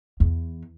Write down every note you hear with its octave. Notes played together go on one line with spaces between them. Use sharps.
E2